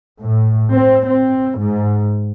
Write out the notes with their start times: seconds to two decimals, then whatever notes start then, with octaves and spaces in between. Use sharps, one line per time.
0.21 A2
0.73 C4
1.07 C4
1.58 G#2